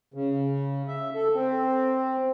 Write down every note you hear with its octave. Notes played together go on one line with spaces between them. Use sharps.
C#3
E5
A4
C4